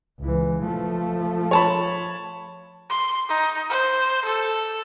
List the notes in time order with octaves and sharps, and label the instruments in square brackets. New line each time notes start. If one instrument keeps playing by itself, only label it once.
[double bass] C#2 E3
F3 A3
[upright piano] C#5 A5 B5
[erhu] C6
D#4
C5
A4